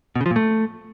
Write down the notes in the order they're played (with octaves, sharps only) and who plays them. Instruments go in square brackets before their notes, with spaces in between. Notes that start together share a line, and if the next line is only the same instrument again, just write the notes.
[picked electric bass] B2
C#3
F3
A#2
A3